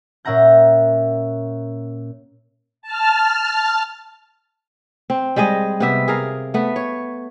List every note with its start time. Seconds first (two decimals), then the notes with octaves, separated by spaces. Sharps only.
0.25 A#2 C#4 E5 F#5 A#5 G6
2.82 A5 F6
5.10 C4
5.36 G3 G#3 G#4 D#5
5.80 C3 B3 E5
6.08 G#4 A#4 F5
6.54 A3 B3
6.76 C#5